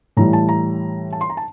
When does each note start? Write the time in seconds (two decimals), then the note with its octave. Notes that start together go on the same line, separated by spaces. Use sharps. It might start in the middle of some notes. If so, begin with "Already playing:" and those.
0.17 A2 E3 G3 A#5
0.33 A5
0.49 A#5
1.13 A5
1.21 C6
1.30 A#5
1.37 A5